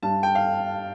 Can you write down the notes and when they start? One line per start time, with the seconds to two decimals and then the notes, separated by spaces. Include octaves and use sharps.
0.02 G2 A5
0.23 G5
0.35 F5